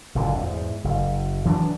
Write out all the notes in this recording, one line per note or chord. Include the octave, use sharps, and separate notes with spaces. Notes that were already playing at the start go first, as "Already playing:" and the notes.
F#1 A#2 D3
E2 G#2
F#1
E3 F#3 C4 D4